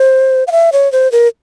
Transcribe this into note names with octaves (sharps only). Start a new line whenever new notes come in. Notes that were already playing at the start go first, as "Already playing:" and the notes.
Already playing: C5
F5
E5
C#5
C5
A#4